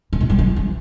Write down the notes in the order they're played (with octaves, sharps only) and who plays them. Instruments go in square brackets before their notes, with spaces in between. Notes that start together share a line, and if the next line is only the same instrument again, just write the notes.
[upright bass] A#2
B2
G3
F#3
E3